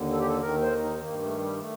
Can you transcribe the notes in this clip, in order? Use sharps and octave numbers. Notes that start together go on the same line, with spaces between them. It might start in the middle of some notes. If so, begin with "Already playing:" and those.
Already playing: D#2 D3
A4
G4
A4
D#2 D#3 A#4
C5
D#4
G2 D#3 A#3
A3
G3
A3